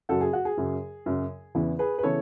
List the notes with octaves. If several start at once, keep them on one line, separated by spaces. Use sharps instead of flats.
F#2 C#3 F#3 F#4 A4
G#4
F#4
G#4
F#2 C#3 F#3
F#2 C#3 F#3
E2 C#3 E3 B3 E4
G#4 B4
B4
C#3 E3 B3 E4 A4 C#5